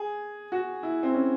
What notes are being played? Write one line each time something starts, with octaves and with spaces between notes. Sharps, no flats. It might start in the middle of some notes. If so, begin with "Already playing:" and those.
Already playing: G#4
F#4
E4
C4
C#4